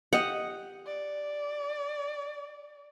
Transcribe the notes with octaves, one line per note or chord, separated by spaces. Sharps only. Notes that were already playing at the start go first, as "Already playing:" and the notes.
G4 D#5 F#5
D5